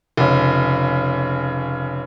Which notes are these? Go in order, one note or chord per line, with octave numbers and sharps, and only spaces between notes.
F1 C#3